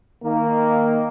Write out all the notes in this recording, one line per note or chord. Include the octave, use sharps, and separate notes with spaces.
D#3 A#3